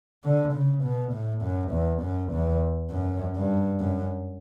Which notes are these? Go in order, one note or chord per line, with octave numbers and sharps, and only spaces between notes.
D3
C#3
B2
A2
F#2
E2
F#2
E2
F#2
G2
F#2